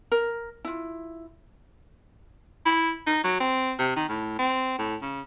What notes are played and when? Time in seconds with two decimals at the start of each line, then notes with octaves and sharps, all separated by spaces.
0.12 A#4
0.65 E4 F4
2.66 E4
3.07 D#4
3.24 F#3
3.40 C4
3.79 C3
3.96 D#3
4.09 A2
4.39 C4
4.79 A2
5.02 C#3